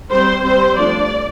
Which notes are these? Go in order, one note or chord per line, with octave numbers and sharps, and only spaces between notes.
G3 C4 C5
G3 C4 C5
F3 A3 D4 D5